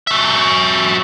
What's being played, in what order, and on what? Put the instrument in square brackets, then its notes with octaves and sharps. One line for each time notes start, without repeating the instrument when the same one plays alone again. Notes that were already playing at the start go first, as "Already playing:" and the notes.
[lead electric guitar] F#3 E5